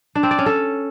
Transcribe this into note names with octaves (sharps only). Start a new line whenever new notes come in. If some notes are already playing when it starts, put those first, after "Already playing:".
D4
C4
D5
C#4
A4